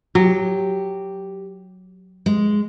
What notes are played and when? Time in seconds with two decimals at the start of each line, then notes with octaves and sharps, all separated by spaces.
0.15 F#3 G4
2.26 G#3